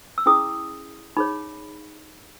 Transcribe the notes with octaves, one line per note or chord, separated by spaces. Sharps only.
E6
C#4 E4 G#4 D#6
D#4 G#4 C#5 B5